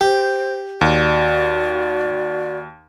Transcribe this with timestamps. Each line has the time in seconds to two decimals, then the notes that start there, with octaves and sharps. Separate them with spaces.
0.01 G4 C5
0.81 D#2 F#4 D5